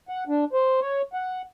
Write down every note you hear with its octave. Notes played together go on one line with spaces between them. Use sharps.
F#5
D4
C5
C#5
F#5